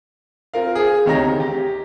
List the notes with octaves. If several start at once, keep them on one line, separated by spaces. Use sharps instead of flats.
C4 F4 A#4 F5
G#4
D2 C3 D#3 C#5 A#5 A#6
A#5
G4